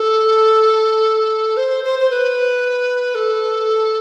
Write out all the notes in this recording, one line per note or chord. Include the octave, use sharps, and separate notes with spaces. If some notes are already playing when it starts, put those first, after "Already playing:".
Already playing: A4
C5
C5
C5
B4
A4